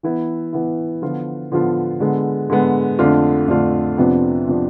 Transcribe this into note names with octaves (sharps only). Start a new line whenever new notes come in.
E3 B3 E4
E3 B3 E4
D3 F3 B3 F4
D3 F3 B3 F4
D3 G#3 B3
D3 G#3 B3
F2 D3 A3 D4 F4
F2 D3 A3 D4 F4
F2 C3 F3 B3 D4
C3 F3 B3 D4